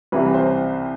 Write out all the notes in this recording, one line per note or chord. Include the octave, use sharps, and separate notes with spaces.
C2 C3 E3 B4
C5